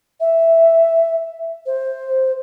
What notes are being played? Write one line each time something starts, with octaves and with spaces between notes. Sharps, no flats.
E5
C5